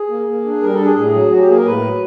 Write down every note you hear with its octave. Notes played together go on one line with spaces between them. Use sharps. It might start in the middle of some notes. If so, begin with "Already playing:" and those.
Already playing: G#4
A#3
A#3
D4
G3 A#4
A4
D4
G#4
A2 G#4
F#3
F#3 F#4
G4
A#3 G#4
A#4
A2 B4
F#3